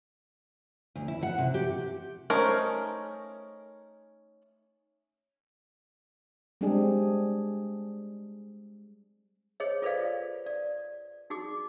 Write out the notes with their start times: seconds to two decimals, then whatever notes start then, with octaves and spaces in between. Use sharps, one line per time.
0.96 D2
1.08 E4
1.23 F#5
1.38 C3
1.54 G4
2.30 A3 C#4 D#4 A#4 C5
6.61 G3 G#3 C4 D4 G4 G#4
9.60 G#4 C5 C#5 D#5
9.82 F4 A4 B4 C5 D5 F5
10.46 D5
11.30 D#4 F#4 G#4 D6